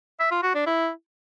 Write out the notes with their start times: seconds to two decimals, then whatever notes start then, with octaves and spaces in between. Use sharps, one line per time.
0.20 E5
0.31 F4
0.43 F#4
0.55 D4
0.66 E4